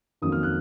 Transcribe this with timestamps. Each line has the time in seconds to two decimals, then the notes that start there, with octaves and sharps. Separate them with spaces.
0.22 F2 D#3 F#3 A#3 C#4 D#6
0.32 F6
0.43 F#6